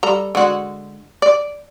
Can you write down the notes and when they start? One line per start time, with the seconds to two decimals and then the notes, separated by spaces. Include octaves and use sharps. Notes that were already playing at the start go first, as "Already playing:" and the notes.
0.03 G3 A4 A#5
0.35 D3 G#3 F#4
1.22 D5